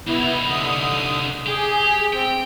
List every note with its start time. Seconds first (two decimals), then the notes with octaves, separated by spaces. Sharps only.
0.07 C2 B3 D#4 E4
0.50 D3 D#6
1.47 G4 G#4
2.13 C4 G5